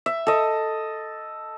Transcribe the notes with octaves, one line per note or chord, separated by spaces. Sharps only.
E5
A4 D#5